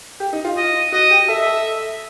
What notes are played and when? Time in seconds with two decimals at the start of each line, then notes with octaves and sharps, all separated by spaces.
0.20 G4
0.33 D#4
0.45 F4
0.57 D#5
0.92 F#4 D#5
1.11 G4
1.28 A4 E5
1.47 A4